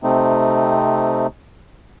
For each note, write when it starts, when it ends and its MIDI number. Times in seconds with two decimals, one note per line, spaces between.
0.03 1.27 48
0.03 1.27 57
0.03 1.27 60
0.03 1.27 63